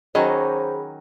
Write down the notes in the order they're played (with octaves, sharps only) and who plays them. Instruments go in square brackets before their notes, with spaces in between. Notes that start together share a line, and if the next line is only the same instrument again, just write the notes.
[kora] D#3 F#3 C#4 [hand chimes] G#4 B5 [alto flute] C5 [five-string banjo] D#5